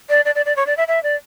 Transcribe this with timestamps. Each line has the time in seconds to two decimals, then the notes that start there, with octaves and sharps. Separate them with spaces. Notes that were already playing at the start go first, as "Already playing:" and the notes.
0.09 D5
0.25 D5
0.35 D5
0.46 D5
0.56 C#5
0.67 D5
0.77 E5
0.88 E5
1.03 D5